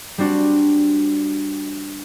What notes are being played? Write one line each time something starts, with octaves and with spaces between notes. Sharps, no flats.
G3 C4 D4 F#4